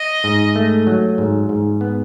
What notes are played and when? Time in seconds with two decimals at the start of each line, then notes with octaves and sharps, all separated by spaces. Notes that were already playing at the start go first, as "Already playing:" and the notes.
Already playing: D#5
0.24 G#2
0.56 A3
0.87 F#3
1.18 G#2
1.49 G#2
1.81 B3